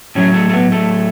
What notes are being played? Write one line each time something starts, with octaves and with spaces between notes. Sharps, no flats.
A2 F#3 C#4
A3
A3
B3
A3